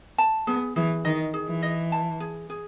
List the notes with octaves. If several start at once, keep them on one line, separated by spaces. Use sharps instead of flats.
A5
B3 G#4
E3 G#4
D#3 D#5
G#4
E3
D#5
A5
G#4
G#4